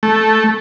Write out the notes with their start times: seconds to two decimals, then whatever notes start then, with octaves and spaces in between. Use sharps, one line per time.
0.03 A3